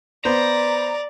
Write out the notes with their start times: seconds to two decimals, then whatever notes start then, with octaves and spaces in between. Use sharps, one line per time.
0.25 B3 C5 D5 A#5